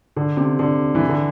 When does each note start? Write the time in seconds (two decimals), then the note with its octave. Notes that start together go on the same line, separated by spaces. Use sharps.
0.16 D3
0.37 C3
0.59 D3
0.95 E3
1.09 D3